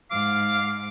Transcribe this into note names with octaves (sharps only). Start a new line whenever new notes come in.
G#2 F5 D6